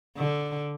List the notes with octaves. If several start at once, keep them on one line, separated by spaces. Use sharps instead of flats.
D3